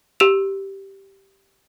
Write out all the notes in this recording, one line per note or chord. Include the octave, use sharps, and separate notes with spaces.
G4 E6 E7 F7